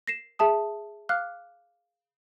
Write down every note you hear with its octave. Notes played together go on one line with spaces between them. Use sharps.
A#6 C7 E7
G#4 E5 A5 D#6
F5 D6 F6 F#6